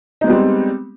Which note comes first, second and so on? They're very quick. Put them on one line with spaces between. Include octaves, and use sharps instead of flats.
D#4 G#3 B3 G3 C4